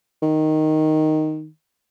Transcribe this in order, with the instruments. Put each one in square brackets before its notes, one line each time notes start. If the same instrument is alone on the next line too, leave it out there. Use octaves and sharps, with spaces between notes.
[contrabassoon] D#3